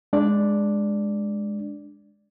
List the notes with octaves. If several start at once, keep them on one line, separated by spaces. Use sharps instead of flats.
G#3 D4 D5